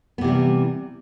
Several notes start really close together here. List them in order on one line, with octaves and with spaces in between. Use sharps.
B3 C3 E3 G3